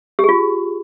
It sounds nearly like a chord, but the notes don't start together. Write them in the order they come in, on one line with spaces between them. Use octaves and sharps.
G4 G#4 F4